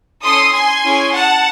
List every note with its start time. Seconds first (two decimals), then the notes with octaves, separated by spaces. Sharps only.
0.22 C#4 E4 A4 C6 D#6
0.53 G#5 C6
0.83 C#4 E4 G#4
1.13 F#5 A5